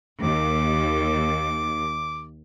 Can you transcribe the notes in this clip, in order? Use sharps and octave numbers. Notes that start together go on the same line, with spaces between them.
D#2 D6